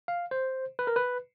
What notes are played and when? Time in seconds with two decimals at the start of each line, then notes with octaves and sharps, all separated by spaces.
0.08 F5
0.31 C5
0.79 B4
0.87 A#4
0.96 B4